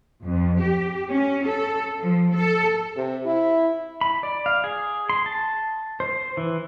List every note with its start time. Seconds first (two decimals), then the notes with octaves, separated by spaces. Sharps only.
0.23 F2
0.59 G4
1.12 C#4
1.45 A4
2.01 F3
2.33 A4
2.97 C3
3.26 E4
4.01 B5
4.23 D5
4.46 F5
4.64 G#4
5.10 C6
5.26 A5
6.00 C5
6.37 E3